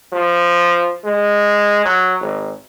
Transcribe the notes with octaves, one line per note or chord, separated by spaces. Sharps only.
F3
G#3
F#3
G#1